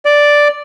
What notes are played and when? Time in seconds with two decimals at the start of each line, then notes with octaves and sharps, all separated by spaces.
0.05 D5